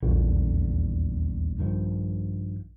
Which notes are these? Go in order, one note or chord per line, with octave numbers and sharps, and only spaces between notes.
D#1 A#1 E2 D3
G2 D#3 F3